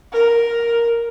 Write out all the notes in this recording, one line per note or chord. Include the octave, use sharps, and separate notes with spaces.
A#4